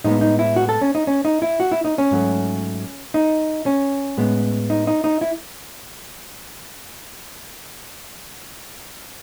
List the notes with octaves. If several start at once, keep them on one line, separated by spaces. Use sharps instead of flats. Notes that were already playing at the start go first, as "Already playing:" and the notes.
A2 G#3 B3 D#4
D#4
E4
F#4
A4
C#4
D#4
C#4
D#4
E4
F#4
E4
D#4
C#4
G#2 F#3 A3
D#4
C#4
A2 G#3 B3
D#4
D#4
D#4
E4